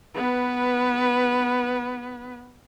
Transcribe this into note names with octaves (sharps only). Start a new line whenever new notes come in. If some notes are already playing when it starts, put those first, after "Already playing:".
B3 B4